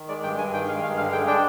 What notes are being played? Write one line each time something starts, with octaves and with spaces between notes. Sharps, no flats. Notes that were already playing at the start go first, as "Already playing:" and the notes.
Already playing: D#3
G#3 D5
G2 G5
G2 G#5
D#3 G5
G#3 F5
G2 F5
D3 F5
G#3 G5
D4 G5